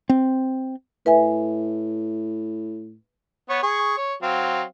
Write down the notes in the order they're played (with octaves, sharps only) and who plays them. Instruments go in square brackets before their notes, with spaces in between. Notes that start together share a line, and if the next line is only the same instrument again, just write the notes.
[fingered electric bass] C4
[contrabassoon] A2 [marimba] B4 E5 G#5
[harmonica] B3 C#5
G#4 C#6
C#5
F#3 C4 F5